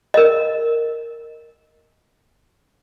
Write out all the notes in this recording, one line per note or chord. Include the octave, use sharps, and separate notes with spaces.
A#4 D#5